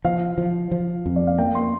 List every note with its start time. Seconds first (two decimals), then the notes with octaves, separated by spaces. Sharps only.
0.05 F3 F5
0.38 F3
0.71 F3
1.06 F2
1.16 D5
1.27 F5
1.38 A#3 G5
1.55 C6